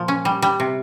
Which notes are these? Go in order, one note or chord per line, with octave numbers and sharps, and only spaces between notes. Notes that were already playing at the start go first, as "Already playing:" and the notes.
Already playing: A#2 F3
C#4
G3
G3
C3